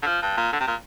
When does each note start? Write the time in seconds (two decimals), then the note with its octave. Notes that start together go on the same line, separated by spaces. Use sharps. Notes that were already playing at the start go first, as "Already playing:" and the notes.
0.02 D3
0.06 F3
0.22 G2
0.37 A#2
0.53 D3
0.60 C3
0.67 A#2